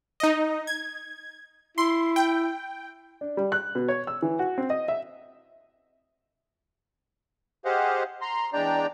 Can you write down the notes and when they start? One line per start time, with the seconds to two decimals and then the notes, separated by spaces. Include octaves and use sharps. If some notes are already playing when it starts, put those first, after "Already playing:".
0.20 D#4 D#5
0.67 G#6
1.78 E4 C6
2.16 G5
3.21 D4
3.37 G3
3.52 F#6
3.75 B2
3.88 C#5
4.07 E6
4.22 E3
4.39 F#4
4.58 C4
4.70 D#5
4.88 E5
7.65 G4 G#4 C5 D#5 F5 F#5
8.21 A#5 C6
8.53 E2 G#3 D4 D5 G5 A#5